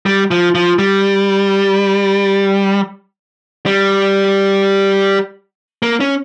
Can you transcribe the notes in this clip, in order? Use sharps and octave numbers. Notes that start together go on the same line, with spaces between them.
G3
F3
F3
G3
G3
A#3
C#4